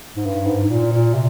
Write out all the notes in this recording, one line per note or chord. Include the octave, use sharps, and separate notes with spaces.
G#2
G2
G#2
G#2
A#2
A#2
C3